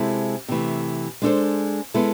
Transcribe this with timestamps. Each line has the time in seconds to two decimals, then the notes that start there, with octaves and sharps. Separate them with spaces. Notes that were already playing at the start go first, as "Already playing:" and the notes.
Already playing: C3 G#3 C4 E4 A4
0.49 C3 E3 A3
1.22 G#3 D4 A4 C5
1.94 G#3 B3 E4 A4